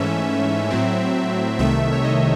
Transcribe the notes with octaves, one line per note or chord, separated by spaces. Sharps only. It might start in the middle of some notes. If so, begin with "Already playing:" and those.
Already playing: G#2 E3 A3 C#4 E5
A2 F#3 C4
C2 C3 D#3 A3 E5
C#5
D#5